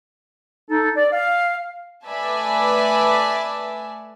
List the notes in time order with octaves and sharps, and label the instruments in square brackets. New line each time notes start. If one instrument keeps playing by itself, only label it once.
[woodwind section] D#4 A4
D5
F5
[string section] A3 B4 D5 E5 G#5 A5